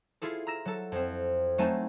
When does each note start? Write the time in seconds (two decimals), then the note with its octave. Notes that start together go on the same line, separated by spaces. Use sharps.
0.22 E4 F4 G#4 A4
0.47 A#5 E6 A#6 E7
0.65 F#3 A4
0.92 F2 C4
1.58 F#3 A3 C4 D#4 G#5 A5